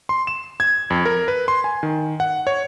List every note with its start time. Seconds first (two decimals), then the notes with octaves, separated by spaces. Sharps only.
0.09 C6
0.27 E7
0.60 G#6
0.90 F2
1.05 A#4
1.28 B4
1.48 C6
1.64 G#5
1.83 D#3
2.20 F#5
2.47 C#5